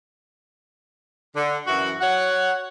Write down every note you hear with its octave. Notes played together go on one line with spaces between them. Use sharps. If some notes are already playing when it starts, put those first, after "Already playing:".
D3
F#2 E3 F#4
F#4 C#5 F#5